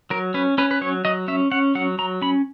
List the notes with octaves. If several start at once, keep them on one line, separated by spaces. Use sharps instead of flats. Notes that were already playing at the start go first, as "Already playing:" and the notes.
F#3 A#4
C#4 B4
C#4 B4
B4
F#3 C#5
F#3 D#5
C#4 E5
C#4 F#5
F#3 F#5
F#3 A#5
C#4 B5